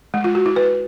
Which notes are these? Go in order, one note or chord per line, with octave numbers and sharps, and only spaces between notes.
G#3
F4
F#4
E4
B4